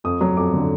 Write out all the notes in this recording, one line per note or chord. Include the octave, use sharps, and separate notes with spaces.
F2 D#6
F#3
F2 D6
D3